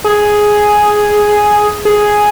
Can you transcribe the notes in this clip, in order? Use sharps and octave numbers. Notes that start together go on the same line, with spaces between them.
G#4
G#4